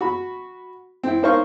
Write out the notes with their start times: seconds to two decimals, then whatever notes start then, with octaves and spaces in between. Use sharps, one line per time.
0.01 F#4 B5
1.03 C4 E4
1.23 D#4 A#4 C5 C#5 F5 C#6